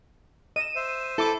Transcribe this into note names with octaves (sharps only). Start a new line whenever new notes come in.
D#5 D#7 E7
C5 E5
E4 A4 D6